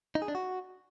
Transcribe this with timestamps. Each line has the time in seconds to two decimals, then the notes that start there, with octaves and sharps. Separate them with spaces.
0.15 D#4
0.22 G#4
0.28 D4
0.35 F#4